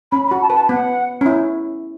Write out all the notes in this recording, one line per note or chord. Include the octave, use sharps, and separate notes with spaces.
C#4 B5
B5
F#4
A5
B4
A5
B3 F#5
C#4
E4